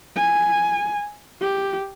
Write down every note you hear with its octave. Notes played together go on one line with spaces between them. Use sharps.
G#5
G4